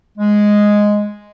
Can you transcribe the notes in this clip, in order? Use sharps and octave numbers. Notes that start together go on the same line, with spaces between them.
G#3